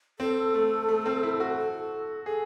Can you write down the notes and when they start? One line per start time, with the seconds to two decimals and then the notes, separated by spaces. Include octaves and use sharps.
0.19 C4 A4
0.54 A3
0.88 A3
1.06 C4
1.23 E4
1.40 F#4
1.58 A4
2.26 G#4 A4